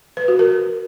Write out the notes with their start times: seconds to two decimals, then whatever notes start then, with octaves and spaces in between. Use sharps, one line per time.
0.17 B4
0.28 F#4
0.39 A#4